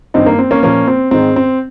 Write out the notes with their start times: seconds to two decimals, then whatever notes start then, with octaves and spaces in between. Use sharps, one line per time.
0.14 G2 D#3 C4 D#4
0.26 A#3
0.39 C4
0.51 A#3 C#4
0.63 A#2 F3 A#3 C#4
0.88 C4
1.11 G#2 D#3 C4
1.36 C4